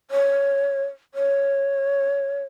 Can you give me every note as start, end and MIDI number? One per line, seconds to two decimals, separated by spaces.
0.11 0.84 73
1.14 2.43 73